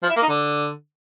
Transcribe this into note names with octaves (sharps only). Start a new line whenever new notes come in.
F3
E4
A#3
D#4
D3